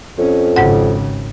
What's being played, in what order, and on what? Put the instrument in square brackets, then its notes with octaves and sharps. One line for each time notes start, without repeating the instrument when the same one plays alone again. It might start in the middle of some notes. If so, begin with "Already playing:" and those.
[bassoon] F2 [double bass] C#4
[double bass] G#1 C#3 [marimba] G#2 F#5